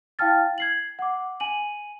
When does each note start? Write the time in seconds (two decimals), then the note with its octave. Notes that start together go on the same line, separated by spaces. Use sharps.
0.19 E4 F5 G5 A5 F6 A6
0.58 G#6 C7 F#7
0.99 F#5 D6
1.40 G#5 D#7 F#7